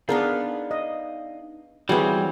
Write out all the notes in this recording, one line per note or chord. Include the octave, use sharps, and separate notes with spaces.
B3 D4 D#4 G#4 A#4 B4 D5 F5
D#5
E3 G3 C4 F#4 G#4 B4 C#5